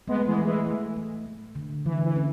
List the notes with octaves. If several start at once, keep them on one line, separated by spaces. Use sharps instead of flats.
G#3 A3 B3
E3 G#3
A3
E3 G#3
A3
A3
A3
D3
D3 E3
E3
C#4